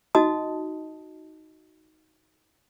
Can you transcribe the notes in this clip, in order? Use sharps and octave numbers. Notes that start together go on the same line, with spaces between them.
D#4 F#4 D#5 A5 D#6